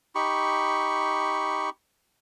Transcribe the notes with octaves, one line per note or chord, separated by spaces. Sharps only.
D#4 G4 B5 C#6